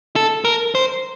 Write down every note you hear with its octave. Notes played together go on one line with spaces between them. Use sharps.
A4
A#4
C5